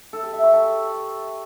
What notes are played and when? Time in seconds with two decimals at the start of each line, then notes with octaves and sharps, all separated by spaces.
0.13 A4
0.23 G4
0.33 E5
0.43 C#6
0.54 A5